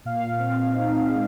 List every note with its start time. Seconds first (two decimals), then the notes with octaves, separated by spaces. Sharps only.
0.05 A#2 F5
0.39 C4
0.74 D#4
1.08 G#3